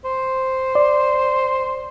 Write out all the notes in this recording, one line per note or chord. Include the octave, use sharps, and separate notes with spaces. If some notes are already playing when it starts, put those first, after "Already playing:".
C5
D5